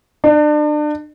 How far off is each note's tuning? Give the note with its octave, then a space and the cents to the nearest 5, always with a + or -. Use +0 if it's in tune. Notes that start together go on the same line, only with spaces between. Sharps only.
D4 +35